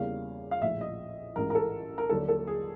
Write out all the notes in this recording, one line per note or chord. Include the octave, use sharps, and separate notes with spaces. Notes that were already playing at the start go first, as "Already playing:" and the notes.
Already playing: E2 C#3 E3 G3 A#3 F5
F5
A#1 A2 F3 E5
D#5
A1 G#2 E3 A#4
A#4
A4
A#4
D#2 D3 F#3 A#3 A4
A4
G#4